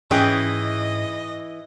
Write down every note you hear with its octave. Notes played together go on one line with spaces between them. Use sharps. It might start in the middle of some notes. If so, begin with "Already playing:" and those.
G#2 E3 C#4 G#4 D#5 G5